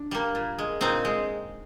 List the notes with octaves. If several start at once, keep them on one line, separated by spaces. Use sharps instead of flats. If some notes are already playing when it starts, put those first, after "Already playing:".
Already playing: D4
G3 A#3
A#2
G#3
A#2 C4 D#4
G#3